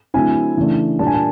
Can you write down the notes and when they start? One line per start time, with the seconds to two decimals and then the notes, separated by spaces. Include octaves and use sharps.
0.14 D3 F#3 A3 C4 E4 G#5
0.57 C#3 E3 A3 D4
0.99 A#2 G3 A#3 D4 A5
1.07 G#5
1.14 A5